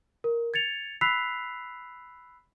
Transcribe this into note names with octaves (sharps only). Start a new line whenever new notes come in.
A#4
G#6 A6 C#7 F7
B5 E6 F#6 B6 C7 F7